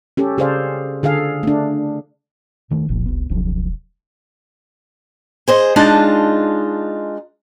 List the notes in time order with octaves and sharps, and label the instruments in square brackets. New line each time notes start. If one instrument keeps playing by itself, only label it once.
[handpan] C#4 G4 A4
C#3 G#4 A4 C5 D5 F5
D3 G#4 A4 F5
A3 D4
[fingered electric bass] D#1 D#3 A3
[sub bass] F1 [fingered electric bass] C2 A#2 F3
[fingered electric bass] C2 B3
[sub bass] E1 [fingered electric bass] C#2 F3 F#3
[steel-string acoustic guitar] G#4 C5 D#5
G#3 D4 D#4 F4 D#5 A5